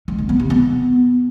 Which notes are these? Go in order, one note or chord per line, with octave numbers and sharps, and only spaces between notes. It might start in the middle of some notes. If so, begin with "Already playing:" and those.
G#3
D3
B3
C3
B3